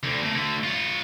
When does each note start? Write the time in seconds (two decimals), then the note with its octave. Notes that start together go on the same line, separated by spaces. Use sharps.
0.03 D2 D3
0.23 A3 A#3
0.35 D3 A3
0.64 F4 C#5